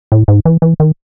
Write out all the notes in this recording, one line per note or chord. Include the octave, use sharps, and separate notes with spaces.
A2
G#2
E3
E3
D#3